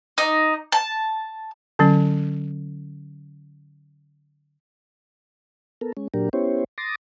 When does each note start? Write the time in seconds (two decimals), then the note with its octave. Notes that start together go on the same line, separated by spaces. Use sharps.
0.18 D#4
0.72 A5
1.79 D3 F#3 C#4
5.81 B3 A4 A#4
5.97 G#3 C#4
6.14 A#2 F#3 D4 G4 A#4
6.33 B3 C#4 E4 G4 C5 C#5
6.78 C6 D6 D#6 A6 A#6